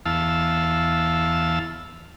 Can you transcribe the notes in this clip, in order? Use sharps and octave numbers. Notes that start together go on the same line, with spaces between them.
E2 F5 A5 E6